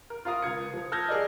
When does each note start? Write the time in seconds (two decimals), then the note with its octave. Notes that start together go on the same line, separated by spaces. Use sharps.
0.10 A#4
0.25 F4 A#4 F5 A#5 D#6
0.42 C#2 G#6 C#7
0.74 F3
0.92 A5 E6 F6 G6 G#6 A#6
1.09 G#4 A#4 D5 D#5